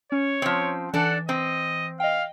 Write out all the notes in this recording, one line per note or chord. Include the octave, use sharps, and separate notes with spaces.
C#4 C#5
F3 C4
E3 D4 A4 F#5
C4 D#5
D#5 F5 G5